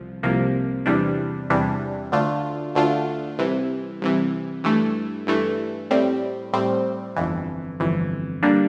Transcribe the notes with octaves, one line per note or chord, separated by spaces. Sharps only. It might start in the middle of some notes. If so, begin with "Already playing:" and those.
Already playing: C2 F3
C2 C3 F3 A#3
E2 C3 E3 G3 D4
E2 C3 E3 G3 D4
D2 D3 A3 D4 F4
D2 D3 A3 D4 F4
C2 C3 E3
C2 C3 E3
G2 E3 A3
G2 E3 A3
A2 G3 C4
A2 G3 C4
G1 F2 E3
G1 F2 E3
D3 G3 A#3 D4